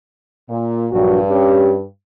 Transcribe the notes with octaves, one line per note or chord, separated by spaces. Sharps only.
A#2
A#1 G2 F#3 F#4
C#4 G4